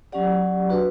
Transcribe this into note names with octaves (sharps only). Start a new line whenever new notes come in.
F#3 C#4 G4 D5 F#5
D4 F#4 B4